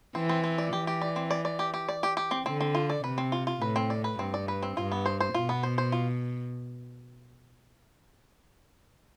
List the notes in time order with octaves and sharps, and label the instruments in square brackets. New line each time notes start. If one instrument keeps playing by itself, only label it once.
[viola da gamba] E3 [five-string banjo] C4
[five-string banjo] C4
C4
D5
[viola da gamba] E3 [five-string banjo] G4
[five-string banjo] G4
D5
C4
D5
D5
G4
G4
D5
G4
G4
C4
[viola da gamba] D3 [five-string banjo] C4
[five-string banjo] C4
F4
D5
[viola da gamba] C3 [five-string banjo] B4
[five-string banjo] C4
F4
F4
[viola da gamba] A2 [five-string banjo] B4
[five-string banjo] C4
D5
B4
[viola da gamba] G2 [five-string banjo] C4
[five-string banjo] D5
B4
C4
[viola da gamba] G2 [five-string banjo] F4
[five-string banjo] B3
C5
C5
[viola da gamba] B2 [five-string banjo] F4
[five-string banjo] B3
C5
C5
F4